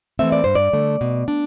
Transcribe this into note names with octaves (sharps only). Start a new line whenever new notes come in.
E3 A3 C4 E5
D5
G2 C5
D5
D3 A3
B2
D4